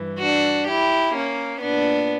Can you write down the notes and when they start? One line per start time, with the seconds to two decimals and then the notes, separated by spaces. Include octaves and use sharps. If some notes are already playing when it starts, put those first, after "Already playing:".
Already playing: G2 E3
0.21 D4 F#4
0.68 E4 G4
1.15 A#3 C#4
1.62 A#2 B3 D4